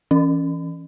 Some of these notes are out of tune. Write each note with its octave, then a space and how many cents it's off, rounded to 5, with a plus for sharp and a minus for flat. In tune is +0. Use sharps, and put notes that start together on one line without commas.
E3 +5 C#4 +0